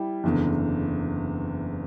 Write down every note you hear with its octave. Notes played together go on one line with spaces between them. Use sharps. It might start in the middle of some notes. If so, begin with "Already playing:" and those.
Already playing: G3 E4
F#1 E2 D3